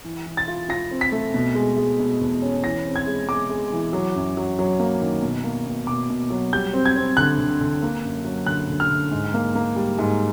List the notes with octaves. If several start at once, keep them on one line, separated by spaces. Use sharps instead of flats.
E3
E3
A6
F4
F4 A#6
C4
B6
A3
B2
G#3
G#3
B2
E2
C#4
E3 A#6
C4
G#6
G#3
G#3 D6
G#3
E3
F#3
F#2
F#3
F#3
A#3
D#3
B2
A#3
B2
B2 D6
B2
F#3
G3 G6
C4
G#6
C4
D3 F#6
D3
D3
A#3
F#2
F#3
D3 F#6
D3
F6
D3
G#2
A#3
A#3
G3
G#2